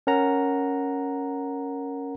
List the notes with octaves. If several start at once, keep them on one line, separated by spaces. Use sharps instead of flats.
C#4 A#4 F#5 A#5